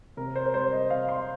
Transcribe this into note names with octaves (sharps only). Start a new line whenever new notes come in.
C3 A#4
C5
A#4
G3 C4 C5
D#5
C3 F5
C6